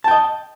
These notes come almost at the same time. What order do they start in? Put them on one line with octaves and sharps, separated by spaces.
A5 G5 D#5